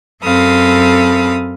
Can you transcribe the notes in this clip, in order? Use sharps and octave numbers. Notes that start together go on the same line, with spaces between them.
F#2 C4 A4 F5 B5 D#6